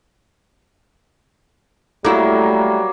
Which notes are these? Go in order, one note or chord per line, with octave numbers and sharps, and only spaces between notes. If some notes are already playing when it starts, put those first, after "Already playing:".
F#3 G3 A3 A#3 E4